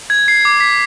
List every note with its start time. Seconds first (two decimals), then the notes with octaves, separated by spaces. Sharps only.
0.10 G#6
0.28 C7
0.45 D6
0.60 B6